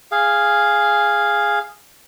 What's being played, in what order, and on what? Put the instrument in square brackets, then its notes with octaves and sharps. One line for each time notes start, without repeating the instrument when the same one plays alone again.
[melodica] G#4 F5